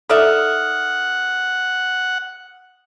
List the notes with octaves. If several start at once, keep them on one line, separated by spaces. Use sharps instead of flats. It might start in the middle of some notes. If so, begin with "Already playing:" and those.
D#4 A4 D5 E5 F#5 D#6 F6